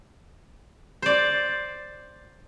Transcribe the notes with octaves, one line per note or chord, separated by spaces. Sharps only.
C5 D5